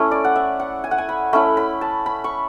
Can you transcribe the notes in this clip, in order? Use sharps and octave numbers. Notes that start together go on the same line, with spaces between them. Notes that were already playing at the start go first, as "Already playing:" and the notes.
Already playing: A3 C#4 E4
D5
F#5
E5
F#5
G#5
F#5
G#5
B5
A3 C#4 E4 B5
B5
A5
B5
C#6